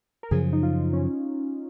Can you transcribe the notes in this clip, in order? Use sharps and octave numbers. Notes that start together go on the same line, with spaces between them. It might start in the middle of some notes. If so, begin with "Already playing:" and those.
A#4
F#2 C#3 F3 G#4
D#4
F4
C#4